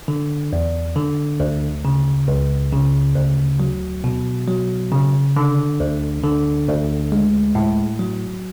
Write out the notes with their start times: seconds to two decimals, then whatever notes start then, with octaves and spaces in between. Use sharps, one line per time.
0.08 D3
0.53 E2
0.96 D3
1.40 D2
1.85 C#3
2.28 C#2
2.73 C#3
3.16 D2
3.60 F#3
4.04 B2
4.48 F#3
4.92 C#3
5.36 D3
5.80 D2
6.23 D3
6.68 D2
7.12 G#3
7.55 A2
7.99 F#3